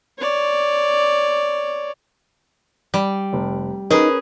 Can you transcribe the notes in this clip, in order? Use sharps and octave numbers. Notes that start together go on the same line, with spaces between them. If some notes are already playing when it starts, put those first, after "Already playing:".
C#5 D5
G3
F1
C#4 D#4 G#4 A#4 B4